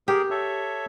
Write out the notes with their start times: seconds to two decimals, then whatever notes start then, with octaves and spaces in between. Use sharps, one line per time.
0.08 G4 G#4 A#4
0.30 A4 C#5 E5